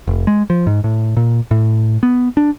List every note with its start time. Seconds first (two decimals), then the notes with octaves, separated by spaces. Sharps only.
0.07 F1
0.27 G#3
0.50 F3
0.67 G#2
0.84 A2
1.17 A#2
1.51 A2
2.03 B3
2.37 D4